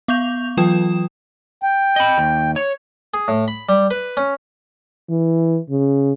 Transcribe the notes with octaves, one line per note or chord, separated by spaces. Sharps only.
B3 F5 C#6 G6 F7
E3 F#3 F4 G5 D#6 E7
G5
D#5 B5
D#2
C#5
G#4
A2
B5
G3
B4
C#4
E3
C#3